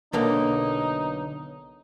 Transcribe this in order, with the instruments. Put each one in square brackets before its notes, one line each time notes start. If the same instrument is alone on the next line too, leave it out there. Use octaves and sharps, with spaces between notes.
[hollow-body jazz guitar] B1 D3 A#3 [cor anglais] D#4